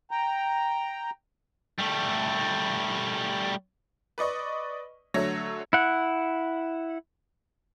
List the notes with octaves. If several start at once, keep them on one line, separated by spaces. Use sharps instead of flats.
G5 A#5
G3 A3
B4 D5 D#5 C#6
D3 F#3 A3 C#5 A#6
E4 F#5